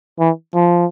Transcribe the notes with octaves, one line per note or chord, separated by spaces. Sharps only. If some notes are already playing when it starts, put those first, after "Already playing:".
E3
F3